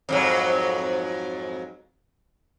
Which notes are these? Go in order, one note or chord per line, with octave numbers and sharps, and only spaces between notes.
F2 G#2 F#3